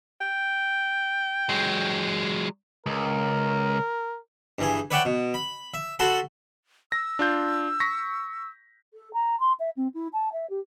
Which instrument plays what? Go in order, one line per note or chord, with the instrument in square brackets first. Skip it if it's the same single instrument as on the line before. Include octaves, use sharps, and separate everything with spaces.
[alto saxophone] G5
[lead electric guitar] F#3 G#3
[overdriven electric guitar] C#2 [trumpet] A#4
[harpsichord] G2 E3 G#4
B4 C#5 D5 E5 F#5 G5
B2
B5
E5
F#4 A4 A5 B5 C6
[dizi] E6 [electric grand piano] A#6
[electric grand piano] D4 F4 G6
C#6 A#6 B6
[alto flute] A4
A#5
C6
E5
C4
E4
A5
E5
G4